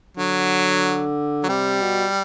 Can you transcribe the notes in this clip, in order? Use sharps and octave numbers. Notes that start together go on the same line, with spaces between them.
D3 F#3
F#3
C3 G3
B2